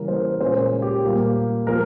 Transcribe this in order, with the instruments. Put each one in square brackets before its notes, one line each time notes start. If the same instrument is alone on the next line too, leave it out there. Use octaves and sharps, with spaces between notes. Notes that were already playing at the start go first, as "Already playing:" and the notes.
Already playing: [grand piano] C#3 E3 G3 A#3 C#4 A#4
C5
A#2 G#3 C#4 C5
G4
A#2 G3 A#3
F3 G#3 A#4